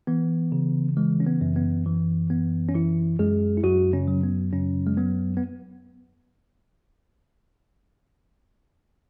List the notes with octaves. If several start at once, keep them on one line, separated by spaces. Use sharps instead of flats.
E3 B3
C#3
E3 G#3
C#4
B3
F#2
B3
E3
F#2 B3
C#4
E3 E4
F#2 G#3 G#4
E4
F#2 F#3 F#4
C#3 C#4
F#3
B3
F#2 C#3 C#4
G#3
F#3 B3
B3